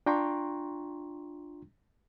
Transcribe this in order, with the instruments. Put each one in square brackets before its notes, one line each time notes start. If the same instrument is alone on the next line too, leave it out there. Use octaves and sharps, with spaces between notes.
[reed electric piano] D4 F4 G5 A#5 C6 C#6